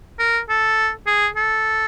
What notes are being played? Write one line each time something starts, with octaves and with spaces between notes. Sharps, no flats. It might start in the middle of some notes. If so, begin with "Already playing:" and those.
A#4
A4
G#4
A4